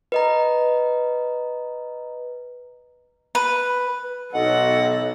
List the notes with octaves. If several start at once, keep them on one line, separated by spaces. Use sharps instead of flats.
B4 D#5 A#5
B4
B1 A4 D#5 F#5